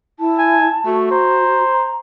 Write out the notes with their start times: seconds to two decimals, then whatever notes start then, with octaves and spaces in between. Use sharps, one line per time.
0.20 E4 A5
0.39 G#5
0.86 A3 F#4
1.11 C5 A#5